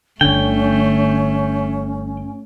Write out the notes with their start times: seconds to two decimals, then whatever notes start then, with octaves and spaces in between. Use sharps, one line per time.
0.21 G1 D3 A3 C#4 G5